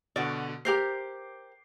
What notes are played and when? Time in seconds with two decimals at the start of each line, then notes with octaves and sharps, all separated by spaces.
0.16 B2 D3 F#4 D5
0.65 G4 A#4 C5 D6 G6 C7